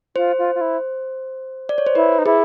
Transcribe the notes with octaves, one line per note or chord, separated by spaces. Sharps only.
F4 C5
F4
F4
E4
D5
C#5
C5
E4 B4
D#4
E4 G#4